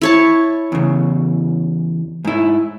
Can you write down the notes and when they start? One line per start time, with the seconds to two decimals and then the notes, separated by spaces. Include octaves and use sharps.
0.02 E4 C#5 A5
0.72 E2 C#3
2.25 G#2 E4